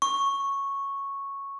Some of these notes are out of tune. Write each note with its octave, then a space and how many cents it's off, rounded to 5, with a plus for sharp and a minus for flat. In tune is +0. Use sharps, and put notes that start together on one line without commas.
C#6 -5